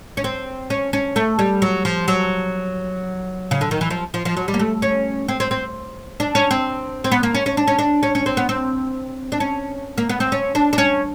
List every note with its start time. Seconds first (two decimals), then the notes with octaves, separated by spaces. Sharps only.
0.17 C#4
0.24 C4
0.70 C#4
0.93 C#4
1.16 A3
1.39 G3
1.62 F#3
1.85 F3
2.08 F#3
3.51 C#3
3.61 D3
3.71 D#3
3.81 E3
3.90 F3
4.14 F3
4.25 F3
4.37 F#3
4.48 G3
4.54 A#3
4.59 A3
4.82 C#4
5.28 C4
5.40 C4
5.51 C4
6.20 D4
6.35 C#4
6.51 C4
7.04 C4
7.12 B3
7.23 A#3
7.34 C#4
7.46 C#4
7.57 D4
7.68 C#4
7.79 D4
8.03 C#4
8.15 C#4
8.26 C4
8.37 B3
8.49 C4
9.32 D4
9.40 C#4
9.98 A#3
10.09 B3
10.20 C4
10.32 C#4
10.55 D4
10.73 D4
10.78 C#4